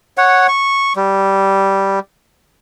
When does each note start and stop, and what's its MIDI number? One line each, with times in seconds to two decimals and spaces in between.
0.18 0.47 73
0.18 0.47 78
0.49 0.93 85
0.96 1.99 55